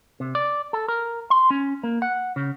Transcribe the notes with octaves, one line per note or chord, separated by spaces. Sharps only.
C3
D5
A4
A#4
C6
C#4
A#3
F#5
C#3